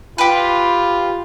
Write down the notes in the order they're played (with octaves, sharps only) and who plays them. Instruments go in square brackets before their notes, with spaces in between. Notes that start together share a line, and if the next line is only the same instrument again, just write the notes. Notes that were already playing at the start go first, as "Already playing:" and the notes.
[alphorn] F4 [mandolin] G4 B4